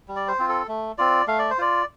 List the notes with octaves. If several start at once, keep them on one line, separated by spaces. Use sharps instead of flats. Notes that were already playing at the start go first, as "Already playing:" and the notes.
G3
D5
C5
C4 F4
A4
A3
C4 F4 D5
A3 F5
D5
C5
F4 D5